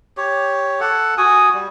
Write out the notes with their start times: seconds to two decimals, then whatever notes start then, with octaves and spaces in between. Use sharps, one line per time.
0.17 G4 C#5
0.80 A4 F#5
1.18 F#4 G#5 D#6
1.54 G3